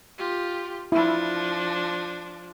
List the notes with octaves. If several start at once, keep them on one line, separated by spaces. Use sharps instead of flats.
F4 G4
F3 D4 E4